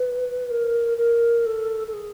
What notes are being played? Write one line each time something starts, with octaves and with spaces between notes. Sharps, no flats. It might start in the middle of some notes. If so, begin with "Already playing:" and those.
Already playing: B4
A#4
A#4
A4
A4
G#4